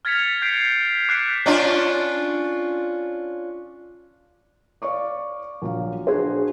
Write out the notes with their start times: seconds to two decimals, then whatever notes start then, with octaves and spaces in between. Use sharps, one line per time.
0.05 F6 G#6 A6 B6 C#7 F7
0.42 G6 B6 C7 D7
1.09 D6 F#6 G6 B6 C7 D7
1.46 C#4 D4 F4
4.82 D5 F5 C#6 D6
5.62 A#1 F#3 F5
6.07 D4 F#4 G#4 C5